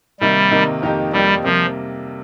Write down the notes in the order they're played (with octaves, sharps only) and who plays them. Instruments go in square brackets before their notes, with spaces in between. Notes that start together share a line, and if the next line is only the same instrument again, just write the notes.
[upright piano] C3 D#3 A#3 D#4 [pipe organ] G3
[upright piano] C3 D#3 A#3 D#4
F2 D#3 A#3 D#4 G4
[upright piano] F2 D#3 A#3 D#4 G4 [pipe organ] G3
[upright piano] C3 G3 A#3 [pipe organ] F3